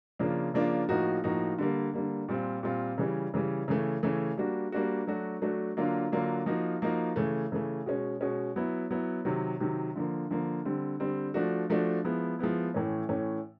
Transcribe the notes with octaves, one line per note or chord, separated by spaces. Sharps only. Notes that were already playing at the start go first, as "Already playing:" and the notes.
C#3 F3 A#3 D4 F4
C#3 F3 A#3 D4 F4
A2 F3 A#3 D#4 F#4
A2 F3 A#3 D#4 F#4
D3 G3 A#3
D3 G3 A#3
A#2 G3 C4 F4
A#2 G3 C4 F4
C#3 E3 G3
C#3 E3 G3
C#3 E3 A3
C#3 E3 A3
G3 A#3 D4 F#4
G3 A#3 D4 F#4
F#3 A3 D4 F#4
F#3 A3 D4 F#4
D3 F#3 A#3 D4 F4
D3 F#3 A#3 D4 F4
F3 A#3 D#4 F#4
F3 A#3 D#4 F#4
C#3 E3 A3
C#3 E3 A3
B2 G#3 C#4
B2 G#3 C#4
F#3 B3 E4
F#3 B3 E4
C3 D#3 F#3
C3 D#3 F#3
D3 F3 A#3
D3 F3 A#3
D3 G3 C4
D3 G3 C4
F3 A3 D4 F#4
F3 A3 D4 F#4
F3 G#3 B3 E4
F3 G#3 B3 E4
A2 E3 A3 C#4
A2 E3 A3 C#4